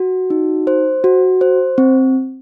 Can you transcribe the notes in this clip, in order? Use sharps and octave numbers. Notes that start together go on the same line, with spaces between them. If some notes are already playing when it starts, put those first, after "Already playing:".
Already playing: F#4
D#4
C5
F#4
C5
C4